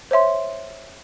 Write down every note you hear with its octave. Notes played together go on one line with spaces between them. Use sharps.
C5 C#5 E5 C6